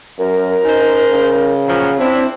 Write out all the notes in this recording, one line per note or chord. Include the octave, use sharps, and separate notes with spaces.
F#2 A#4
C#4 D#4 C5
C#3
A#2 F3 F#3
C4 D4 E4